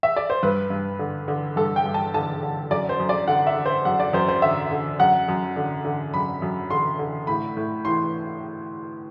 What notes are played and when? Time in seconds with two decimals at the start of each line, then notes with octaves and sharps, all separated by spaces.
0.03 E5
0.16 D5
0.30 C5
0.43 G2 B4
0.70 G2
0.99 D3
1.28 D3
1.56 G2 A4
1.76 G5
1.86 G2
1.94 A5
2.14 D3 A5
2.43 D3
2.71 F#2 D5
2.89 C5
2.99 F#2
3.09 D5
3.28 D3 F#5
3.47 E5
3.56 D3
3.65 C5
3.85 F#2 F#5
4.00 D5
4.13 F#2 C5
4.28 C5
4.42 D3 E5
4.71 D3
4.99 F#2 F#5
5.28 F#2
5.56 D3
5.84 D3
6.14 F#2 B5
6.42 F#2
6.70 D3 C6
6.99 D3
7.27 A2 B5
7.57 A2
7.85 E3 C6